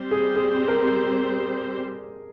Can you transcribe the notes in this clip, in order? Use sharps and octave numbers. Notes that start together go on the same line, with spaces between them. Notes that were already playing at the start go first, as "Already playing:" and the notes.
Already playing: G3 C4 G4 C5
G#4
G#4
A#4